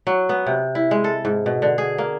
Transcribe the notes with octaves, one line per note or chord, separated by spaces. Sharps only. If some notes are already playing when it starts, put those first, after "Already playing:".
F#3
B3
C3
E4
G#3
A4
G#2
B2
D3
G#4
A#3